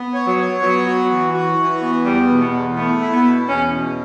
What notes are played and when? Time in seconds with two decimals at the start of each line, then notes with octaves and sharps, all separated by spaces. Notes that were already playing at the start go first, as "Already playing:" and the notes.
Already playing: B3
0.14 C#5
0.27 F#3
0.39 C#5
0.62 F#3 B3
0.86 F#4
1.10 E3
1.34 F#4
1.58 E3
1.82 B3
2.05 E2 G3
2.30 B2
2.41 B3
2.53 E2
2.77 A3 B3
3.01 E4
3.13 B3
3.25 B2
3.48 E2 C#4
3.72 B2